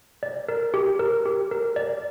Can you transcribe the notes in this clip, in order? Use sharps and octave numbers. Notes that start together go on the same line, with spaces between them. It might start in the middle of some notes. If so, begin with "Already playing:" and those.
D5
A#4
G4
A#4
G4
A#4
D5